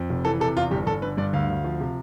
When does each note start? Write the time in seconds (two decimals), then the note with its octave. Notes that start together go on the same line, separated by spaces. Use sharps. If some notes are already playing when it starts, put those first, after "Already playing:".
Already playing: F2
0.10 F1
0.25 E3 A4
0.40 C3 A4
0.56 E2 F4
0.71 G1 G4
0.86 G1 A4
1.02 D3 B4
1.17 G2 D5
1.33 D2 F5
1.49 D2
1.64 F3
1.80 C3